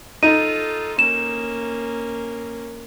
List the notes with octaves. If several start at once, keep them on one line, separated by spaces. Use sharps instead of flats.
D#4 F4 A4 D#7
A#3 C#4 E7